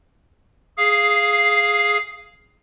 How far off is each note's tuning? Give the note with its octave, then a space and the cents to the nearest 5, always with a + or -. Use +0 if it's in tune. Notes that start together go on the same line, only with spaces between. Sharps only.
G#4 +0 F5 +0